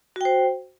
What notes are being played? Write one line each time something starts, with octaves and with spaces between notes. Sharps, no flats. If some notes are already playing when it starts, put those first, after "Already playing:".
F#4 C5 G5